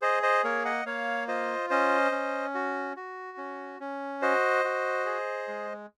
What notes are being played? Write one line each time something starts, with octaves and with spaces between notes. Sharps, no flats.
G#4 C5 D#5
C5 D#5
A#3 A#4 C#5
D#5 F#5
A#3 C#5 F5
F4 C5 D#5
C#4 C5 D#5
C#4
F#4
F#4
C#4
C#4
F#4 C5 D#5
F#4
G#4
G#3